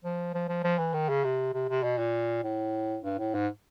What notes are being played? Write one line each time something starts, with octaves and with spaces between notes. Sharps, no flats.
F3
F3
F3
F3
E3
D#3
C#3
C3
C3
C3
B2
A#2
A2
G2
A2
G#2